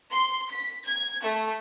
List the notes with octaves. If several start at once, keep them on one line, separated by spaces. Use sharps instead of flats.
C6
B6
G#6
A3